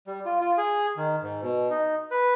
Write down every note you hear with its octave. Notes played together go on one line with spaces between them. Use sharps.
G3
F4
F4
G#4
D#3
G#2
B2
D#4
B4